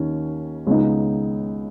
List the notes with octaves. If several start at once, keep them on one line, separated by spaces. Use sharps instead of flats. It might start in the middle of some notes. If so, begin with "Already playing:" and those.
Already playing: D#2 D#3 C#4
C#2 C#3 B3 D#4